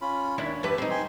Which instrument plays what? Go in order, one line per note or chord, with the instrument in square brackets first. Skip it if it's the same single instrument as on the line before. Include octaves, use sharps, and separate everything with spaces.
[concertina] C#4 F4 B5
[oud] D#2 D4 E4 [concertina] C#5
[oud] F#2 E3 B4 [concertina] G4 A5
[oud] C4 D#4
[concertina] G5 G#5 C6